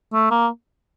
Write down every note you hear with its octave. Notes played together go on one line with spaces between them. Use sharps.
A3
A#3